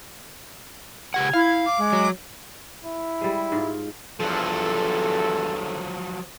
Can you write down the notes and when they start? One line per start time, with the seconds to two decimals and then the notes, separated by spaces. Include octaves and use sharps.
1.14 C#3 G4 F#5 G#6
1.33 E4 F5
1.66 D6
1.78 G#3
1.93 F#3
2.85 E4
3.21 G3 G#3
3.52 G#2 F4
4.20 E2 G2 F3 F#3 A4